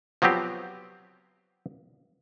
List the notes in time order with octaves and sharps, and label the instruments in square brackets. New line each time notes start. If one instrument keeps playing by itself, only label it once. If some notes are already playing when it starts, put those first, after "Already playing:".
[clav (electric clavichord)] F3 F#3 B3 C4 G4